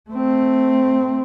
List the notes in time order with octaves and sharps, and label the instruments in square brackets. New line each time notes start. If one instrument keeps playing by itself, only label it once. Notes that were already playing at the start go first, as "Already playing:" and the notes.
[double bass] A3 C4